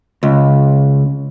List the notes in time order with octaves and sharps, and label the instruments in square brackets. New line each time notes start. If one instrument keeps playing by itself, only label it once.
[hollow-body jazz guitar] C#2